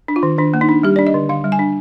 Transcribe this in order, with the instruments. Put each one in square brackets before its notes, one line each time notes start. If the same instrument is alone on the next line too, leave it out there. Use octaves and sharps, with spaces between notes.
[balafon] D4
F4
D#3
D#3 D4
A#3
D#4
D4
G3 G4
D4 D5
D#5
D3
D3 F5
G3
G#5
D4